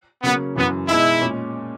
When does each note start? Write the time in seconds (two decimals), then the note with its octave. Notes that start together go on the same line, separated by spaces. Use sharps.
0.23 C#3 F#3 A#3 B3 C#4
0.55 F#2 C#3 E3 B3
0.88 B2 G#3 D#4 E4 G#4
1.21 A#2 G#3 C#4